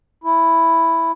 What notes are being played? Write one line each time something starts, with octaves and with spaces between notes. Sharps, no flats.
E4